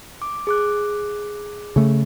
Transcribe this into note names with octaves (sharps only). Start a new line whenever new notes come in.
D6
G#4 D6 F#6
C#3 A3